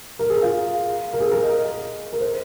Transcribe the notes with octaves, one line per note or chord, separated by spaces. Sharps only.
A#4
G#4
F4
A#4
G#4
A#4
D#5
A#4
C5